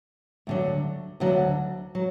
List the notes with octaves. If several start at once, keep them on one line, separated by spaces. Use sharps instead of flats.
D2 D3 F#3
D2 D3 F#3
F#3